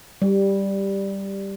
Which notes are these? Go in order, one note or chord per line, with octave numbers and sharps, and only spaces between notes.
G3